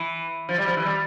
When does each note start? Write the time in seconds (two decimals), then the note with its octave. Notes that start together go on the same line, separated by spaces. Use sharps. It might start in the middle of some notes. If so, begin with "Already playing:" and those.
Already playing: E3
0.49 F3
0.58 G3
0.67 F3
0.76 E3
0.85 G3